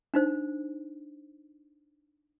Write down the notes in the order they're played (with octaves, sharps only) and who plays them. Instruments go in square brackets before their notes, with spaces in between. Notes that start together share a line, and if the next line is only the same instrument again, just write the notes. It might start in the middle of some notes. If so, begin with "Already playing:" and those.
[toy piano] D4 D#4 C5